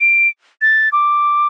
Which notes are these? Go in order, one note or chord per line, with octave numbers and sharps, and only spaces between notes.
D7
A6
D6